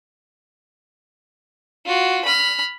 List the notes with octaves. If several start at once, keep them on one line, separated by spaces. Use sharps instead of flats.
F4 F#4
B5 F6